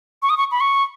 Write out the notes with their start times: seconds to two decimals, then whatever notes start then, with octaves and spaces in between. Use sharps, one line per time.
0.23 C#6
0.30 D#6
0.38 C#6
0.51 B5
0.61 C#6